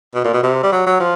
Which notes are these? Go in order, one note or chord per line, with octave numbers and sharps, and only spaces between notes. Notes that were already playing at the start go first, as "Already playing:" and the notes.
B2
A#2
B2
C3
G3
F#3
F#3
F3